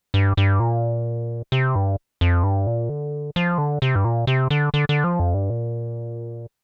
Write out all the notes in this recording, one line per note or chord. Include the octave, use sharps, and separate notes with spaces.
G2
G2
A#2
C3
G2
F2
G2
A#2
D3
F3
D3
C3
G2
A#2
C3
D3
D3
D3
F3
F2
G2
A#2